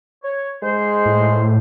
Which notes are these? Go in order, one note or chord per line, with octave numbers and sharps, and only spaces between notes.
C#5
G#2 G#3 C5
A2